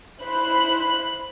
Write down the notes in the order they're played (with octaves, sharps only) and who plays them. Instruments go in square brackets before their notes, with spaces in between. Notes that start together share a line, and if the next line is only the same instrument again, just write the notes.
[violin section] E4 C5 B5 F#6